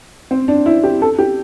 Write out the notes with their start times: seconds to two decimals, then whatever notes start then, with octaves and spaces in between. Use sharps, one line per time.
0.31 C4
0.48 D4
0.66 E4
0.84 G4
1.02 A4
1.19 G4